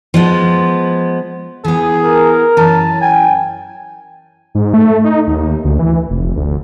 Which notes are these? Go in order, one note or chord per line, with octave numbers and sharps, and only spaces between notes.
F3 G#3 B3
E3 B3 G#4
A#4
F#2 E3 C#4 A5
G5 G#5
G#2
A3
D#4
D#2
D2
E3
F1
D2